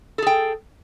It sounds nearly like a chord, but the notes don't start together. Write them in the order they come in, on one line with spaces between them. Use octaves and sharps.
A4 G#4 G5